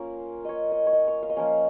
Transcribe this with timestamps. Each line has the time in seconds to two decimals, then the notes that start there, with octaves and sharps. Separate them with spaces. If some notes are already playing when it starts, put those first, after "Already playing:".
Already playing: A#3 C#4 F4 A#4
0.45 C#5 D#5
0.72 D#5
0.87 C#5
0.93 D#5
1.07 C#5
1.23 F5
1.30 D#5
1.37 F3 A#3 C#4 F5